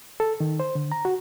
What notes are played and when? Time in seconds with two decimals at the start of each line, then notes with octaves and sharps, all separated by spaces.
0.20 A4
0.40 D#3
0.60 C5
0.75 D3
0.92 A#5
1.05 F#4